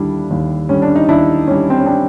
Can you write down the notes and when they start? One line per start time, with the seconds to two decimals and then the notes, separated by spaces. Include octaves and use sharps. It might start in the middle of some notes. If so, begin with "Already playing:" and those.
Already playing: D#2 D3 G3 D4 E4
0.31 D#2
0.69 D3 G3 C#4
0.82 D4
0.96 D#4
1.09 D#2 D4 E4
1.47 D3 G3 C#4
1.70 C4
1.78 C#4
1.86 C4 D4